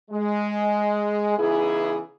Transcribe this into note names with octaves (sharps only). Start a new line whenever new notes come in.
G#3
C#3 E3 B3 D#4 E4 G#4